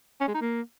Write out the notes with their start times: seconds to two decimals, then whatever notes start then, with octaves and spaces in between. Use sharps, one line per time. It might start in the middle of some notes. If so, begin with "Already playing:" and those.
0.21 C#4
0.28 G#3
0.35 D#4
0.41 A#3